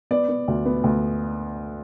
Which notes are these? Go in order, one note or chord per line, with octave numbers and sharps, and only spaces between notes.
B3 D5
B3
D2
B3
D2